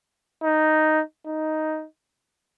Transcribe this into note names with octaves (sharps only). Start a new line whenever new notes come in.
D#4
D#4